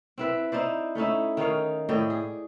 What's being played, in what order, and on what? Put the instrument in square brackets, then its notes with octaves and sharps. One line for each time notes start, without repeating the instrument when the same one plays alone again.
[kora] C4 E4 B4
D#4 E4 C5 D5
A3 C#4 D#4 E4
D#3 D#4 C#5 F5
A2 D5 D#5 G5
G#4